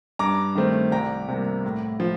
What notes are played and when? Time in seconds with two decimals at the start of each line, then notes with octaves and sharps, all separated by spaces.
0.19 G2 A#5 D6
0.55 D#3 A3 C4
0.92 C2 G5 A#5
1.28 C3 G3 A#3
1.65 A2
2.00 F3